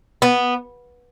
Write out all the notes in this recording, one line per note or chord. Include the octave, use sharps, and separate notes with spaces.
B3